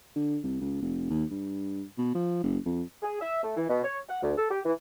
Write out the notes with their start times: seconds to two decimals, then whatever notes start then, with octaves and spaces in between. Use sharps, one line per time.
0.16 D3
0.43 C2
0.61 C#2
0.82 F1
1.10 D#2
1.31 G2
1.98 B2
2.15 F3
2.43 F#1
2.66 F2
3.03 G#4
3.20 E5
3.43 A3
3.56 E3
3.69 B2
3.84 C#5
4.09 F#5
4.22 D2
4.37 A4
4.51 G4
4.65 E3